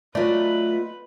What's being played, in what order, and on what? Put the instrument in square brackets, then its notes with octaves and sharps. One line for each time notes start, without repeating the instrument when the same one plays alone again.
[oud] F#3 A3 [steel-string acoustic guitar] B3 F4 D#5 [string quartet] B4 [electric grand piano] D5